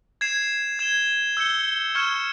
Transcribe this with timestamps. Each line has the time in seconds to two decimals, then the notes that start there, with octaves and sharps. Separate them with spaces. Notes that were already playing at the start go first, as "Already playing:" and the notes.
0.21 G#6 C7 E7
0.79 G#6 E7 G7
1.37 E6 G6 C#7 G7
1.95 C#6 F6 G#6 C#7 E7